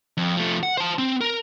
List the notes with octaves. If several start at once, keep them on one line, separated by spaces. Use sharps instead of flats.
F2
F3 A3
F#5
C5 A5
C4
A#4